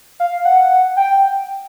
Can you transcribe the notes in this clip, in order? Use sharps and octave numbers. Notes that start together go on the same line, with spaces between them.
F5
F#5
G5